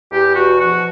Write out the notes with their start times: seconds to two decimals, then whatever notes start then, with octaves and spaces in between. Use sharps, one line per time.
0.12 E2 G4
0.36 B2 F#4
0.60 F3 F#4